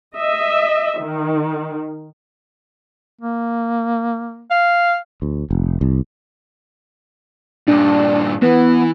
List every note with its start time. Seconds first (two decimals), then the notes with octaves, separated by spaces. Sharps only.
0.16 D#5 E5
1.00 D#3
3.21 A#3
4.51 F5
5.22 D2
5.51 F1
5.81 C2
7.68 G2 A#2 D4
8.42 E3 B3